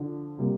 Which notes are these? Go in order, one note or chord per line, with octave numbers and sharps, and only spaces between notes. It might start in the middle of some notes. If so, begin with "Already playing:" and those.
Already playing: D3 F3 D4
C3 G3 A#3